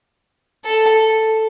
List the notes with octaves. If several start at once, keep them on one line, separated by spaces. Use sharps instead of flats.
A4